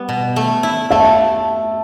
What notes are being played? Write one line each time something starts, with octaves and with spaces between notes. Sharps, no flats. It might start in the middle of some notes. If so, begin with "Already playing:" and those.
Already playing: G3 B3
B2
A3
E4
A3 E5 A5